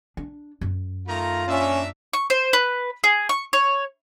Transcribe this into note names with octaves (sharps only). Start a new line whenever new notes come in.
D4
F#2
D#3 A3 F4 A#5
A#2 C#4 D4 E5
C#6
C5
B4
G#4
C#6
C#5